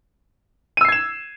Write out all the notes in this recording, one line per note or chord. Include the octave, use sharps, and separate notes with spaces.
E6 G#6 C7 D#7 E7